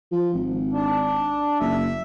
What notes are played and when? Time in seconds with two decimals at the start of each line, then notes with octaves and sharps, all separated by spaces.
0.12 F3
0.33 G#1
0.72 D4
1.60 F#1 E5